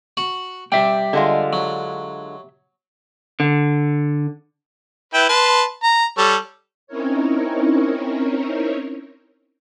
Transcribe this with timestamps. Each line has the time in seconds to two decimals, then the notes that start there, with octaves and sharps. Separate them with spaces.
0.17 F#4 F#5
0.72 G3 G4 E5 G5
1.13 D3 G#3 F4
1.53 F#3
3.40 D3
5.14 E4 B4 G5
5.29 B4 A5 C6
5.83 A#5
6.18 G3 A4 C#5
6.87 C4 C#4 D#4 E4 A#4 C#5